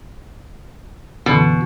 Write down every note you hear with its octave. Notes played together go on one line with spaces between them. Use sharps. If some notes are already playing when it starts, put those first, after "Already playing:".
F#2 B2 D3 E3